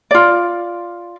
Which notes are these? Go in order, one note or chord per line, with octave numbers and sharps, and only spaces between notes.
F4 D5